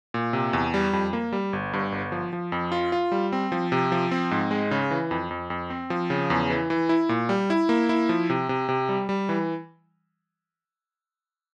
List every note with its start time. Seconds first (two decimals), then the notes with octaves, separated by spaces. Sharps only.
0.14 A#2
0.33 C3
0.53 E2
0.74 G3
0.93 F2
1.13 A#3
1.32 G3
1.53 G1
1.73 G2
1.92 G1
2.12 F3
2.33 F3
2.52 F2
2.72 F4
2.92 F4
3.12 G3
3.32 C4
3.52 F3
3.72 C3
3.92 F3
4.11 C4
4.31 G#2
4.51 G#3
4.71 C#3
4.91 E3
5.11 F2
5.31 F2
5.50 F2
5.70 C4
5.90 F3
6.10 C#3
6.30 E2
6.50 E3
6.70 E3
6.89 E4
7.09 A#2
7.29 G3
7.50 E4
7.69 A#3
7.89 E4
8.09 F3
8.30 C3
8.49 C3
8.69 C3
8.89 G3
9.09 G3
9.29 E3